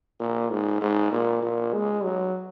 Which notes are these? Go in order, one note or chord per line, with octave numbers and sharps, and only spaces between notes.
A#2
G#2
G#2
A#2
A#2
G#3
F#3